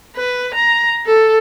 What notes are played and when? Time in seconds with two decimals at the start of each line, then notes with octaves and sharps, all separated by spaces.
0.16 B4
0.54 A#5
1.06 A4